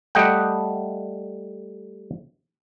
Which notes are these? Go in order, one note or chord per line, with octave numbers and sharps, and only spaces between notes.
G3 A3 D#5 F#5 G5